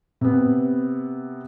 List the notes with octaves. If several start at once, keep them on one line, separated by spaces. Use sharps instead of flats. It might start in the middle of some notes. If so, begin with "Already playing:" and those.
C3 B3